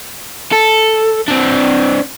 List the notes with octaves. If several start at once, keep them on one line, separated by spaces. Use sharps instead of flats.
A4
C4 D4